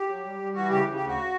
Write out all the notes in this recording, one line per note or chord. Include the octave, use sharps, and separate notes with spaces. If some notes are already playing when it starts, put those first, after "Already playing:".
Already playing: G4
F#3
G3
G3
E3 F#4
C#3 G4
C#3
G4
D2
F#4